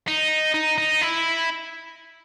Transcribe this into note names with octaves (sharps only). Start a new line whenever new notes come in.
D#4
D#4
D#4
E4